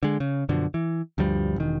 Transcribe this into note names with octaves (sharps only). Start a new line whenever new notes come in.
D3 G#3
C#3
F#2 B2 D3 F3
E3
D2 G2 F3 G3
E1 D#3